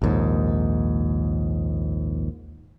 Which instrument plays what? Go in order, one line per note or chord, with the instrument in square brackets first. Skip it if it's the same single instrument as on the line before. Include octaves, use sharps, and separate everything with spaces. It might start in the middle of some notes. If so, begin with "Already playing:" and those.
[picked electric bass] A#1 D#2 G#2